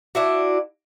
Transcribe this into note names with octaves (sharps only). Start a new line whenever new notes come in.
D4 E4 F#4